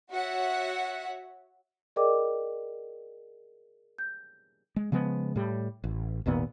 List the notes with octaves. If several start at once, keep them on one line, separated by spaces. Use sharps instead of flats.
F#4 C#5 E5 F#5
G#4 A#4 D5 D#5 G5 D6
G6
G#3
C#3 F3 G#3 B3
A2 G3
A1
G#1 D#2 A#2 B3